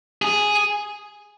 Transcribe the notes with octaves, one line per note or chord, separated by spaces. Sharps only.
G#4